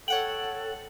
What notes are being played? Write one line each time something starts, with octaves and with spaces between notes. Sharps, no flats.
A4 C#5 F#5 G5 F#7